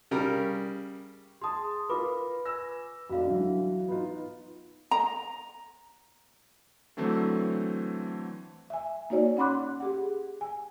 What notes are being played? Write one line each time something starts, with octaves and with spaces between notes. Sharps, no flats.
C#3 G3 A#4
G#4 A5 C6 D#6
F4 A#4 B4 B5 D6
G#5 E6 A#6
F1 F#4 D5 F5
D3 E3 F#3
B3 D#4 F4
A#5
D3 E3 F#3 A3 C4
E5 G#5
A#3 D#4 F#4 C#5 D5
C#4 F#5 B5 C6 D6 F#6
G4 G#4 F#5
G#5